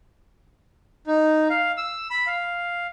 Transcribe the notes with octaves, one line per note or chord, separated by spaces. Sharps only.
D#4
F5
E6
B5
F5